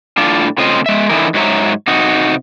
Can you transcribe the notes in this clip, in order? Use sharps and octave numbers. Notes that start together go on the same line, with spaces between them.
A2 D4 F4
C#3 A3 C4 F4 C5 D#5
G#3 E5
D3 E3 D#4 E4 A#4
G#2 F#3 C#5 E5 A#5
C3 D#4 F#4